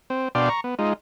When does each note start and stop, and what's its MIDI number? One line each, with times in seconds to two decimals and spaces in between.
0.10 0.28 60
0.35 0.49 47
0.35 0.49 62
0.35 0.49 74
0.35 0.49 77
0.35 0.49 79
0.35 0.49 84
0.49 0.61 82
0.49 0.61 85
0.64 0.75 59
0.79 0.93 56
0.79 0.93 63
0.79 0.93 65